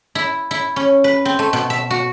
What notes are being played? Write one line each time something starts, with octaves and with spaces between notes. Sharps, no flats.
E4
E4
C#4
B4
C4
A3
B2
E5
F#4